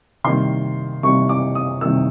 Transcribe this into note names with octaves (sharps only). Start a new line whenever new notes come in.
C3 D#3 G3 A#3 C6
C3 D#3 G3 A#3 C#6
D6
D#6
C3 D#3 G3 A#3 E6